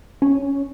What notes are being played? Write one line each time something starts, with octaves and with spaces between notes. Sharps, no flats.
C#4